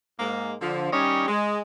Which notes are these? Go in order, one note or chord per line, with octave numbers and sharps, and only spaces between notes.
G#2 G#3 A#3
D3 F3
D#3 G3 C#4 G4 C#5 D#5
G#3